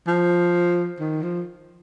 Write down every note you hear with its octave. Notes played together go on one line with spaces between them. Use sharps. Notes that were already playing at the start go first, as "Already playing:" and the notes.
F3
D#3
F3